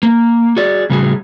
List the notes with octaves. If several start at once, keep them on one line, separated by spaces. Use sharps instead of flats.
A#3
F#4 G#4 D5
A2 C#3 F#3 G3 F#4 G#4